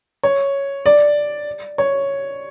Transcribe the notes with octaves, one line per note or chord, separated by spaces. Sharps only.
C#5
D5
C#5